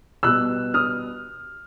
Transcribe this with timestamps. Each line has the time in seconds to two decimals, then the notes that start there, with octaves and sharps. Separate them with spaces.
0.23 B2 G3 B3 E6 F#6
0.74 D#6 F6